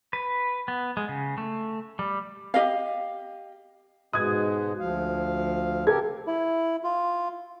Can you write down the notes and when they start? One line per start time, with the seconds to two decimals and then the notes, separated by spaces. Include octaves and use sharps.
0.13 B4
0.68 B3
0.97 G#3
1.09 C#3
1.38 A3
1.99 G3
2.54 G4 D#5 F5
4.13 G#2 B2 G#3 D#6 F#6 G#6
4.80 D2 F3 F5
5.87 C#3 G4 A4 A#4 G#6
6.27 E4
6.84 F4